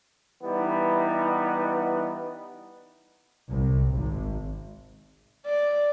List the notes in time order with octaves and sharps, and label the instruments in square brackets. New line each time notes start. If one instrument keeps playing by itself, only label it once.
[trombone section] E3 G3 B3 D#4
[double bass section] C2
G#1
[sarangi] D5